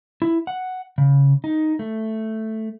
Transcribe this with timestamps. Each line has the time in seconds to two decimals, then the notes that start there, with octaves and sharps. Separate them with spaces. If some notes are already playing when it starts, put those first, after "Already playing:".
0.22 E4
0.47 F#5
0.98 C#3
1.44 D#4
1.79 A3